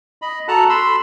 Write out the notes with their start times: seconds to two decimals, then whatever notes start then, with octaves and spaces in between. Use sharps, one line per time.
0.22 D#5 B5
0.48 F#4 A4 F#5 A5 A#5 F#6
0.69 B5 C6 E6